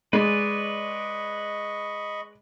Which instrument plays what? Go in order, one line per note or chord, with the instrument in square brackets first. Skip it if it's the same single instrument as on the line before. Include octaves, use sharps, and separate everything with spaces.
[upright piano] G#3 [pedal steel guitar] B4 D5 [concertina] D#5 B5 C#6